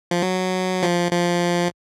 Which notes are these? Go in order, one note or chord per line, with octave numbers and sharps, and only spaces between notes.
F3
F#3
F3
F3